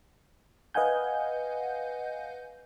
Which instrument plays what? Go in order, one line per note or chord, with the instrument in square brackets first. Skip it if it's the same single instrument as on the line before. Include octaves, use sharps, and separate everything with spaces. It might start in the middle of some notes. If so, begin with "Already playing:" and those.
[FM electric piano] B4 D#5 F5 F#5 G#5 G6